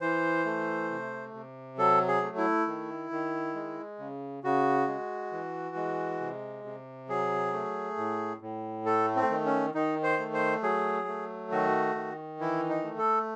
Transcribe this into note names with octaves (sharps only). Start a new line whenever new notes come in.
E3 C5
A3
C3
C3
F#3 A4
G#4
A3
E4
D#3
D#3
G#3
C#3
C#3 F#4
G#3
E3
G#3
C3
C3
F#3 G#4
A3
A2
A2
A3 A4
C4
D#3
C#4
D#3 D#4
C5
A3
C5
F#3 G#4
A3
D#3 F#4
D#3
E3 E4
D#4
A3
A4